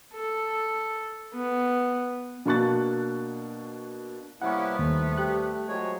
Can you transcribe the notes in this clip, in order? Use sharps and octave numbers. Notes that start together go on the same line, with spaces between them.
A4
B3
B2 A#3 D4 C#6 F#6 A6
C3 G3 A#3 B3 C#4 E4 F#5 C#6
D#2 A3
G4 F#6
F3 F#3 G#3 G4 G#4 C#5